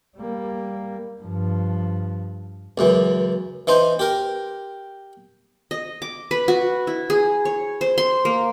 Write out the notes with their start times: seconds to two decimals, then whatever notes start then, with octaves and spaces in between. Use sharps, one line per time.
0.17 G3 A#3
1.22 G2 F3
2.78 C#2 F#2 E3
3.67 E3 D#4 C5
3.99 G4 A#4
5.71 D#5
6.02 D6
6.31 B4
6.48 F#4
6.87 E4
7.10 G#4
7.45 C#5
7.81 C5
7.98 C6
8.25 A#3